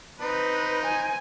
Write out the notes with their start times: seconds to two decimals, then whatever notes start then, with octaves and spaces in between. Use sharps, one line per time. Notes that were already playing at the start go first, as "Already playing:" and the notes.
0.21 C4 D#4 B4
0.86 G#5